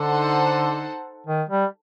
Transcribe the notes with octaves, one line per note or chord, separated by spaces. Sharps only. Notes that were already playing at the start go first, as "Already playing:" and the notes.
Already playing: D3 D#4 A4 C5 F#5
D#3
G3